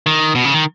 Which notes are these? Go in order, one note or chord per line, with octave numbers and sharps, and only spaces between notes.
D#3
B2
C#3
D#3